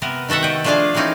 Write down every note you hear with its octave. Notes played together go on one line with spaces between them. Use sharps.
C3 B3 A#4
D#3 F#4 A4 E5 F#5
D#5 G5
F3 A3 D4 F4 G#4 F5
E3 A#3 C4 C#4 D#4